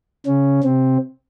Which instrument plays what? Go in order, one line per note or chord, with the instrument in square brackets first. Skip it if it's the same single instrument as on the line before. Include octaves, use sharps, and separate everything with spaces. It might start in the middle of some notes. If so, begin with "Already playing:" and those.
[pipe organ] C#3 C#4
C3 C4